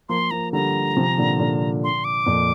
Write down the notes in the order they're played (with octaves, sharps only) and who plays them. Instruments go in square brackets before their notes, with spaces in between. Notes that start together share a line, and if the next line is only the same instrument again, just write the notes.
[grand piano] F3 A#3 [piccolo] C6
[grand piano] F3 A#3 [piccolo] A#5
[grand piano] D3 G3 [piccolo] A#5
[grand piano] C3 F3
A#2 D3
A#2 D3
[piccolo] C6
D6
[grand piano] F2 A#2